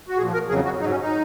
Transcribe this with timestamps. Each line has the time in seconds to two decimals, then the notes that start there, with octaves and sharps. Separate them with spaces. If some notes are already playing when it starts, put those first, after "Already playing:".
0.09 F#4
0.18 A#2 F3 G#4
0.34 A#4
0.49 F2 C#3 F#3 G#4
0.65 F#4
0.81 G#2 F#3 D#4
0.91 C#4
1.01 D#4